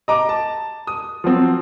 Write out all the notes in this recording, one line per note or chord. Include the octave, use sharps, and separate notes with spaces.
D#5 A#5 D6
A5
D#6
F3 F#3 C4